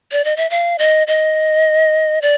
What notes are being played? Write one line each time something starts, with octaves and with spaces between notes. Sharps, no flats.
D5
D#5
E5
F5
D#5
D#5
D5